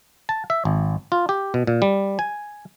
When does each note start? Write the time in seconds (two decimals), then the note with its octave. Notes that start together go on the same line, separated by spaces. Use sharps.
0.29 A5
0.50 E5
0.65 G#1
1.12 F4
1.29 G4
1.54 B2
1.67 A#2
1.82 G3
2.19 G#5